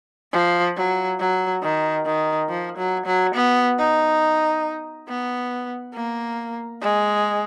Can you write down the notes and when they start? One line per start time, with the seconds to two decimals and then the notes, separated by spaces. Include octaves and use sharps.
0.32 F3
0.77 F#3
1.20 F#3
1.63 D#3
2.06 D#3
2.49 F3
2.77 F#3
3.06 F#3
3.35 B3
3.79 D#4
5.08 B3
5.95 A#3
6.81 G#3